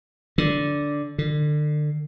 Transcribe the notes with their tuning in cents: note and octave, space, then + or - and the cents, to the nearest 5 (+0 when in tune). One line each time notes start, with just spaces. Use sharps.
D3 -10
D3 +30